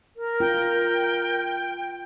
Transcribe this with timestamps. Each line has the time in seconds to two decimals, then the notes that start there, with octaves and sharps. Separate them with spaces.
0.17 A#4
0.40 F4 G5